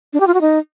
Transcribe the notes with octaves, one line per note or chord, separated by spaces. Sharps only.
D4
G4
F4
F#4
D#4